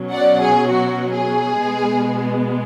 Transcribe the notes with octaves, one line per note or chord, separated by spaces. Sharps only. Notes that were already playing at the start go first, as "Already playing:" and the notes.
Already playing: B2 F#3 C#4
D5 F#5
G#4
F#4
G#4
B2 G#3 B3